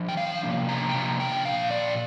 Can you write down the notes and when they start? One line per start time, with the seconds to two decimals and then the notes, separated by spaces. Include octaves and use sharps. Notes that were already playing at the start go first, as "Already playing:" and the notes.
Already playing: F3 D4
0.09 G5
0.17 F5
0.43 C3 F3 A#3 D4
0.69 A#5
0.89 G5
0.94 C3 F3 A#3 D4 A#5
1.20 G5
1.45 A#2 F3 D4 F5
1.71 D5